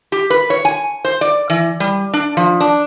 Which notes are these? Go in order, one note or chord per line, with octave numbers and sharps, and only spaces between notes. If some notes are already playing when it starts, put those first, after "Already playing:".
G4
B4
C#5
G#5
C5
D5
E3
G3
D4
F3
D4